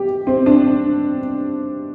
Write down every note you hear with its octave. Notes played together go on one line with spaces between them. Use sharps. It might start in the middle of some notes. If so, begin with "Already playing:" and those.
Already playing: G4
C4
D4